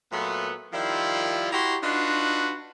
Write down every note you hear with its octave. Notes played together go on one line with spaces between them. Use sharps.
A#2 F#3 A3 B3
D#3 F3 G3 E4 F4
E4 F#4 G4 A#5 C6
D4 D#4 F4 F#4 B4